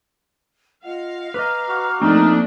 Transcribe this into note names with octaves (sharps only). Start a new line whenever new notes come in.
F4 D#5 F5 F#5
B4 D#5 A#5 D6 F6
F#4
F3 A3 A#3 C4 D4 D#4